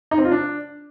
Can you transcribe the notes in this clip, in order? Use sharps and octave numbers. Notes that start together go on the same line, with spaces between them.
D#4
C4
F4
D4